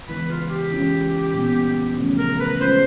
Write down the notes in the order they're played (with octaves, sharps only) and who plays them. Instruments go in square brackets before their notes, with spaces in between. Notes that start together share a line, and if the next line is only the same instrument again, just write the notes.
[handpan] C#3 E3 G#3 B3 [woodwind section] B4
[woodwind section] F4
G4
[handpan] E3 G#3 C#4 F4
A#2 G3 B3
C#3 F3 A3 C#4
[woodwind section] A#4
B4
[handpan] G#3 C#4 F4 A#4 [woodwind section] C5